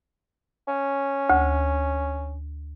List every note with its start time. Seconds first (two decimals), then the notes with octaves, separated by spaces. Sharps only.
0.68 C#4
1.30 D2